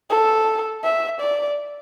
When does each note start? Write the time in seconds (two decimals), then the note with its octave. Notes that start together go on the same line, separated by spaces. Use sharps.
0.10 A4
0.84 E5
1.20 D5